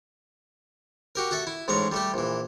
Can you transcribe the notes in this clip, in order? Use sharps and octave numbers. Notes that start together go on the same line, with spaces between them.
F#4 G4 A#4
F#4 A4 E5
E4
A1 G#2 G#3 C#4 A#5
G3 A3 G4
A#1 E3